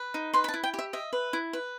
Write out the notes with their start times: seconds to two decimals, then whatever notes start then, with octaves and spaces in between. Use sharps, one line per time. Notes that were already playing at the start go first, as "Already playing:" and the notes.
Already playing: B4
0.14 D#4
0.34 B4 C6
0.44 B5
0.48 A5
0.54 E4
0.64 G5
0.74 G4 E5
0.93 D#5 E5
1.13 B4
1.33 E4
1.53 B4